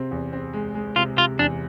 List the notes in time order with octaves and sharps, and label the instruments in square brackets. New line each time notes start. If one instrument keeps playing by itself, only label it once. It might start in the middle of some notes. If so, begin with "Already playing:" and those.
Already playing: [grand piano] C3 C4
E2
C4
G#3
G#3
[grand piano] C3 [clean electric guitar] F4
[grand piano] C3 [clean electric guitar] F4
[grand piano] E2 [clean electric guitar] D4